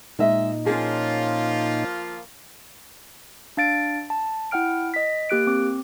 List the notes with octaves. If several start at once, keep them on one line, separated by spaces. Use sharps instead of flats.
A#2 G#3 D#4 D#5 E5
F3 A#3 C#4 F4 G#4
D4 F5 A6 D7
A5
E4 F#5 G5 F6 D7
D#5 B6
A#3 G4 F#6 D7
C4 D6